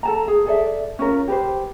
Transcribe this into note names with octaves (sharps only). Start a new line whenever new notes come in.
A4 A5 A#5
G#4
G#4 A4 D5 E5
C#4 F4 A#4
G4 B4 C5